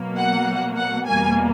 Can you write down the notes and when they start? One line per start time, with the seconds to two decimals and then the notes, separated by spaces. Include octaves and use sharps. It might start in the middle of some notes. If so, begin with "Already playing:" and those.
Already playing: B2 F#3 A#3
0.16 F#5
0.76 F#5
1.06 E2 B2 G3 A#3 G#5